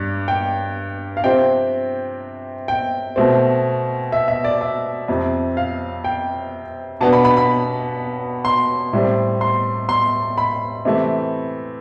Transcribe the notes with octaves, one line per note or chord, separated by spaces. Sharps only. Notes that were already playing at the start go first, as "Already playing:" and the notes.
Already playing: G2 D5
G5
F5
C3 F3 C4 G5
G5
B2 A3 C4
E5
E5
D5
E5
F2 C3 F3
F5
G5
B2 B3 D4 A5
B5
B5
B5
C6
A2 G3 C4
C6
C6
B5
C3 E3 A3